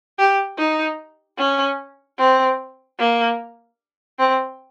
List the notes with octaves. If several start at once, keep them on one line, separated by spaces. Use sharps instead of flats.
G4
D#4
C#4
C4
A#3
C4